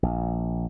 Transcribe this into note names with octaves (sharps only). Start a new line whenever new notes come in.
A#1